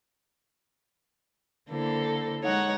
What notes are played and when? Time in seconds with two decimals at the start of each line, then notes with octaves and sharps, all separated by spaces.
1.70 D3 A#3 E4 A4 C5
2.42 G#3 D#4 C#5 F#5